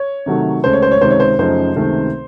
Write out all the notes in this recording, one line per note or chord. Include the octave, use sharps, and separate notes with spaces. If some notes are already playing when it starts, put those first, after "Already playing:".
Already playing: C#5
C3 D#3 F#3 A3
C#2 C#3 A3 C5
C#5
C5
C#5
C#2 C3 D#3 C5
C#5
C5
F#2 C#3 F3 A3 D#4 C5
C#2 C3 D#3 A3 C4